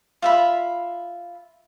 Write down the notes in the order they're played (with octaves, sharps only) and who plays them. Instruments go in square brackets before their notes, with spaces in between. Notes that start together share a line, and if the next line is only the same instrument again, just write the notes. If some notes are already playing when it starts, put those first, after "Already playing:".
[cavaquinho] F4 E5 B5